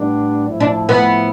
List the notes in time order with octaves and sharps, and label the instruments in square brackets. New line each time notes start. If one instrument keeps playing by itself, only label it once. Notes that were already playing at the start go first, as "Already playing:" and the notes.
Already playing: [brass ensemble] A2 G3 B3 D4
A2 F3 A3 E4
[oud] D4
B3